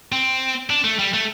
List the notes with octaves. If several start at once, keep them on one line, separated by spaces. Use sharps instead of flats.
C4
D4
A3
G3
A3